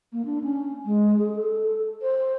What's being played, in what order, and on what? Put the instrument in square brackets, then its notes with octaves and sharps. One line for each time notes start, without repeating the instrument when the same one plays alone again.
[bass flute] A#3
D4
C#4
G#3
G#4
A4
C5